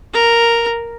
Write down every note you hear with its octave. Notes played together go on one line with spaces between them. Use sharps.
A#4